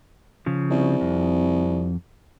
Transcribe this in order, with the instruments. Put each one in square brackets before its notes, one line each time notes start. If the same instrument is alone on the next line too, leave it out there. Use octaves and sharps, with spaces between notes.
[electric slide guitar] C#3 F3
[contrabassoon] C2
[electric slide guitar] F2